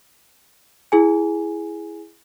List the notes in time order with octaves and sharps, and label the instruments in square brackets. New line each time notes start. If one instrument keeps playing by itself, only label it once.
[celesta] E4 G#4 G#5